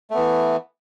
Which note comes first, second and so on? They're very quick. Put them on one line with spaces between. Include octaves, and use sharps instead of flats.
A3 B3 E3